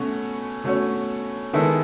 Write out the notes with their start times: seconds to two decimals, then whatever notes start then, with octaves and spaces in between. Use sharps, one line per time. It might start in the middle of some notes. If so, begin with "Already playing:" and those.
Already playing: B2 A3 C#4 F#4 C#5
0.64 B2 A3 C#4 F#4 C#5
1.53 D#3 G#3 B3 E4 A4